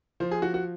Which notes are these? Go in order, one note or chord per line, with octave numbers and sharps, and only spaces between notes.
F3 C5
G#4
F3 F#4
F#4